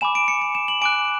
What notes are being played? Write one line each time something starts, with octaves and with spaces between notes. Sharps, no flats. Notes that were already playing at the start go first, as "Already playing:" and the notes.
G#5 B5 D6 E7
D7
C#7
C#7
E7
F#7
G#5 D6 F#6 D7